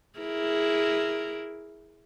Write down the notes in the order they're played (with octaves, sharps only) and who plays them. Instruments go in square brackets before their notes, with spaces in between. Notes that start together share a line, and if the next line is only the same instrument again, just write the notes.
[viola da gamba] E4 G#4 A#4